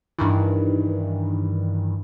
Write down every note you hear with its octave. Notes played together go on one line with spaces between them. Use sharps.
G2 D#3 E3